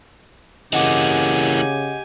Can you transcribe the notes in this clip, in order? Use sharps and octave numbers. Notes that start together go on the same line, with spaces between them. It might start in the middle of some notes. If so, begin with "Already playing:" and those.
C#3 E3 A#3 G4 D#5 F#5 G#5 D6